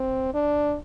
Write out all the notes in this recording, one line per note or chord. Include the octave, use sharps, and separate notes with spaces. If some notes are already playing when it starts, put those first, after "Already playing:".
Already playing: C4
D4